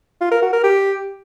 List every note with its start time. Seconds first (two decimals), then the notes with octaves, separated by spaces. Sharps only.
0.21 F4
0.31 A#4
0.42 F#4
0.53 A#4
0.63 G4